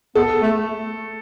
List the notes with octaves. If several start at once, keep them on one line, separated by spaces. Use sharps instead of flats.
B3 A4
A3